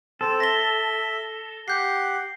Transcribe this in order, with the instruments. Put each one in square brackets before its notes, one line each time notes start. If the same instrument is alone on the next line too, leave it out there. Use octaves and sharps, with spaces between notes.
[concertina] C4 [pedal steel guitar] A4
[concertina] E5 [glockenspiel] A#6 G7
[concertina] G4 F#5 [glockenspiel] G6 C7